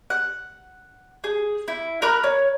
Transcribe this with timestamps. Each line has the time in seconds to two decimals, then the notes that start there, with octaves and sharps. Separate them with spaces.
0.10 F#5
1.24 G#4
1.68 E4
2.02 A#4 A#5 B5 F#6
2.24 C#5